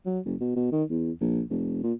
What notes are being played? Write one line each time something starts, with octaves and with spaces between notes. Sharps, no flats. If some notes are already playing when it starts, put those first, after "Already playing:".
F#3
F#1
B2
B2
D#3
E2
A#1
F1
A#2